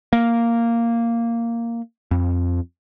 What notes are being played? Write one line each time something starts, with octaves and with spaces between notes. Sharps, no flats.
A#3
F2